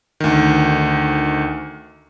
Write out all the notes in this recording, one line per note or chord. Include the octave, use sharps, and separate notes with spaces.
D2 D#3